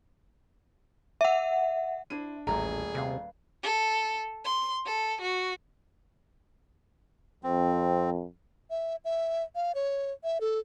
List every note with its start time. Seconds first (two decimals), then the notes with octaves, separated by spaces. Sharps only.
1.21 E5 F#5
2.10 D4 E4 C5 D#7
2.47 D#1 A1 A3 G#4 A#5
2.95 C3 B4 F5
3.63 A4
4.45 C6
4.86 A4
5.21 F#4
7.44 F2 C4
8.70 E5
9.05 E5
9.55 F5
9.75 C#5
10.24 E5
10.41 A4